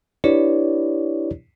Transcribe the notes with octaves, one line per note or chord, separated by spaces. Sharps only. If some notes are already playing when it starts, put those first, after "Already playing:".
D4 E4 G4 B4 C#5 D5